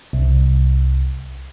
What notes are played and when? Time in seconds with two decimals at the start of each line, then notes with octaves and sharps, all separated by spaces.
0.13 C2